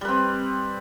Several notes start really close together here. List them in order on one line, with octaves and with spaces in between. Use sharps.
G3 B4 C4